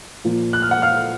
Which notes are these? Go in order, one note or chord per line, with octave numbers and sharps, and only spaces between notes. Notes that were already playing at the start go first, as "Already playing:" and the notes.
A#2 F3 A#3
F#6
F6
F#5 F#6
F5 F6